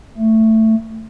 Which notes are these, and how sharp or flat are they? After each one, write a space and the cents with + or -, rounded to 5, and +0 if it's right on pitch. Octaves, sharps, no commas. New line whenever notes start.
A3 +10